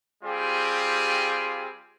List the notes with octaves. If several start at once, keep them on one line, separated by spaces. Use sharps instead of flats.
G3 C4 F4 G4 G#4